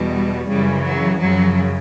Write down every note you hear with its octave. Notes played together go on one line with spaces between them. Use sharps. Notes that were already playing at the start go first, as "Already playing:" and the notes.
Already playing: E2 B2 G3
F#2 C#3 E3 G3
F#3
F#2 C#3 F3 F#3